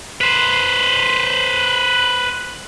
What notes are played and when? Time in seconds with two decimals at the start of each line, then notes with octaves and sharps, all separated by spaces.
0.21 B4 C5